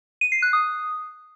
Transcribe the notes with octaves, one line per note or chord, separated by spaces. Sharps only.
D#7
C7
F#6
D#6